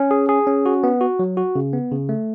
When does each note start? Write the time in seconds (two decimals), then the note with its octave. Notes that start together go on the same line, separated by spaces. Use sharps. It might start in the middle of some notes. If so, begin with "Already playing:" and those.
Already playing: C#4
0.11 G#4
0.29 G#4
0.47 C#4
0.66 F#4
0.84 B3
1.01 F#4
1.19 F#3
1.37 F#4
1.55 C#3
1.73 B3
1.91 C#3
2.09 A3